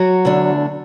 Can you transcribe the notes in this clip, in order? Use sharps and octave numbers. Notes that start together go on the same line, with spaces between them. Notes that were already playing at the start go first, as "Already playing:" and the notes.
Already playing: F#3 F#4
E2 D3 A3 D4